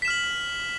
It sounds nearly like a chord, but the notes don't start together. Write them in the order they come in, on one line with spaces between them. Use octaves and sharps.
B6 E7 F6 F#7